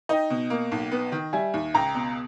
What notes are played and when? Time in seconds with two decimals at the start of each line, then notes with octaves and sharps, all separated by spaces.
0.09 D#4 D#5 G5
0.30 B2
0.50 A#3
0.72 B1
0.92 B3
1.12 D#3
1.33 G3 E5 G#5
1.54 D#2
1.74 C#2 G5 A#5
1.95 B2